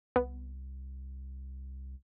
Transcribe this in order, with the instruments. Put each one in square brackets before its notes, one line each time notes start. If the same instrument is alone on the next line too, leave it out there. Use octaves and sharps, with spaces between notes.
[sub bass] C2 [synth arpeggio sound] B3